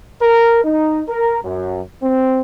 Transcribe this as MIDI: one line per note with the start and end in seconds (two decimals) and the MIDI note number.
0.21 0.61 70
0.64 1.02 63
1.08 1.38 70
1.43 1.81 42
2.02 2.41 60